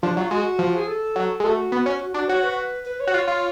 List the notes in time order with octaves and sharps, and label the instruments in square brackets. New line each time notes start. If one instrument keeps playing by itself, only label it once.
[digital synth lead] F3 [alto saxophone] D4
[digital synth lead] F#3 [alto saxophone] F4
[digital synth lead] G#3 [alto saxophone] F#4
[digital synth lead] F3
[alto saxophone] G#4
A4
[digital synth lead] F#3
G#3
[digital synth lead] A3 [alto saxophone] F#4
[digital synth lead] B3
C#4
[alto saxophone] F#4
[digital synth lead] D4 [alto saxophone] F#4
[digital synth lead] F#4 [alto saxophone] C#5
[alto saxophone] B4
B4
C#5
[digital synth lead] F#4
[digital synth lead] F4 [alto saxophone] C#5
[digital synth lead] F4